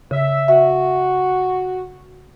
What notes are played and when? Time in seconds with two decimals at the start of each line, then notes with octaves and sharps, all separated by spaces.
0.11 C#3 E5
0.48 F#4 E5